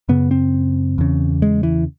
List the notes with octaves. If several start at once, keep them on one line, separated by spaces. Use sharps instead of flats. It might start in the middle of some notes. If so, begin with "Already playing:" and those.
F#2 C#3 B3
C4
E2 C#3
G#3
E3